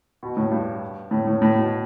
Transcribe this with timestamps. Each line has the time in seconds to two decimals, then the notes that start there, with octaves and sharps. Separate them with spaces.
0.23 B2
0.37 A2
0.51 G2
1.11 A2
1.27 A2
1.42 A2
1.56 B2